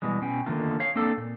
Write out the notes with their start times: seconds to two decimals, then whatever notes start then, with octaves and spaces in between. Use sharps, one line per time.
0.02 B2 E3 G3 G#3
0.22 B2 C#4 G5
0.46 D3 D#3 A3 A#3 D#4 F4
0.80 C#5 F5
0.96 A#3 C4 D4 A4
1.17 A#2